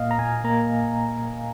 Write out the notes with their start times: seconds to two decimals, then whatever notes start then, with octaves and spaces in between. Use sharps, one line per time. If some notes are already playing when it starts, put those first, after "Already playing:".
Already playing: A#2 A#3 D#5 F5
0.11 A#5
0.19 A#2 G#5
0.44 A#3 A#5